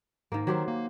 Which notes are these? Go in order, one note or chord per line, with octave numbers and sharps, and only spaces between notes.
G#2 D#3 A#3
D#3 F#3 G4 C5
A#3